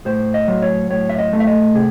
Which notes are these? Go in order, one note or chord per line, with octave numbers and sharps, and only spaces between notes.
A2 C5
D#5
F#3
C#5
A2 C#5
E5
D#5
A3
E5
D#5
C3 G#4